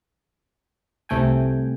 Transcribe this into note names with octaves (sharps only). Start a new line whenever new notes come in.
C2 C3 A3 G5 G#5